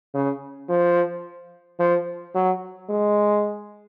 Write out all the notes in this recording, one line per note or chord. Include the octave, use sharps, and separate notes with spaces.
C#3
F3
F3
F#3
G#3